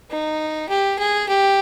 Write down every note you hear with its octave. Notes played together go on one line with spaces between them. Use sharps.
D#4
G4
G#4
G4